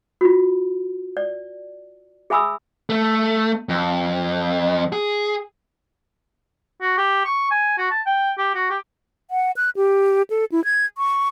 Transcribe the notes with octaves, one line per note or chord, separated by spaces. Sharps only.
F4 F#4
D5
G#4 E5 G#5 B5 D#6 E6
A3
F2
G#4
F#4
G4
C#6
G#5
F#4
A5
G5
G4
F#4
G4
F#5
F#6
G4
A4
E4
G#6
C#6